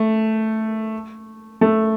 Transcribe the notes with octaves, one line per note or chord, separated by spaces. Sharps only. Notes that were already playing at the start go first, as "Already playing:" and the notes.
Already playing: A3
A3